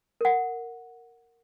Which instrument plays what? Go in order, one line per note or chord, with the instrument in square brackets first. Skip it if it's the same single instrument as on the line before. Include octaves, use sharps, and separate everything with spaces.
[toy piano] A#4 F#5